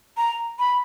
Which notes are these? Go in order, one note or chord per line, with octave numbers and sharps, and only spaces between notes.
A#5
B5